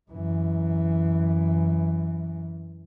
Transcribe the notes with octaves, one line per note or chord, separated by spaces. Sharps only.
F#2 E3